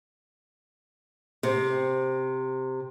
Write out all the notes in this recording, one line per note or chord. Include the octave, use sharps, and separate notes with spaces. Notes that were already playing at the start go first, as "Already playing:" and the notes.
C3 C4